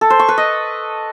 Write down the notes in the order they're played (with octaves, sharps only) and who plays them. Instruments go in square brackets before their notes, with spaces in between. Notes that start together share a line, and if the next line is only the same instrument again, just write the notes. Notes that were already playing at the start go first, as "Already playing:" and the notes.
[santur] A4
C5
C#6
B4
D#5